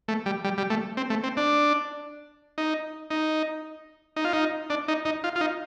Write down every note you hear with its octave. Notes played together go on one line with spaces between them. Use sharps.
A3
G3
G3
G3
A3
C4
A3
C4
D4
D#4
D#4
D#4
F4
D#4
D4
D#4
D#4
F4
F4
D#4